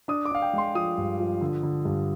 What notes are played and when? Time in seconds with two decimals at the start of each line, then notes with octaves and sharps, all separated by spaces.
0.08 D4 D#6
0.25 D6
0.31 D4 F5
0.42 G5
0.53 G#3 C6
0.75 F3 D#6
0.98 G2
1.20 F3
1.41 D3
1.63 D3
1.85 G2